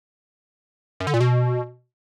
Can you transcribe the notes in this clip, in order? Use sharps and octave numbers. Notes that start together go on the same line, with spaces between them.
F#2
D3
A#2
B2